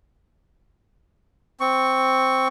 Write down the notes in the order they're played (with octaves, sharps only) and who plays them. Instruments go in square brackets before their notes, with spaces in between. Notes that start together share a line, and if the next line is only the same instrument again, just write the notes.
[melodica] C4 C#6